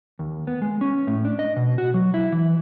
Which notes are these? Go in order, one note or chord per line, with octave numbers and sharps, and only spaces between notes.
D#2
B3
G#3
C#4
A2
D4
D#5
B2
F#4
F#3
E4
E3